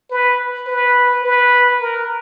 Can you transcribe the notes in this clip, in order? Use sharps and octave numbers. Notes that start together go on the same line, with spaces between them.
B4
B4
B4
A#4